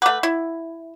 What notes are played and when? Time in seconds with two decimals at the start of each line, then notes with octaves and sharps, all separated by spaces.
0.02 A3 B4 F#5 D6
0.23 E4